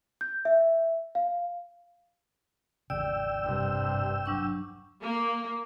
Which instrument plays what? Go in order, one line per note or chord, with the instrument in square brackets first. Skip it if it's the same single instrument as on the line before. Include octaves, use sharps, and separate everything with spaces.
[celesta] G6
E5
F5
[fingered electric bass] G#1 E2 C#3 [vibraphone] D5 [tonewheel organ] G5 E6
[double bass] G2 C3
[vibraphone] F#3 D4 C#6
[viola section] A#3